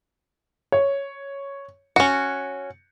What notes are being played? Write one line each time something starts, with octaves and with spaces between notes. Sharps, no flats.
C#5
C#4 F#4 C#7